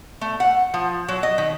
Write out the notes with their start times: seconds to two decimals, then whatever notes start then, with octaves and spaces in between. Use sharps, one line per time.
0.21 A3
0.40 F#5
0.74 F3
1.08 F#3
1.23 D#5
1.38 D#3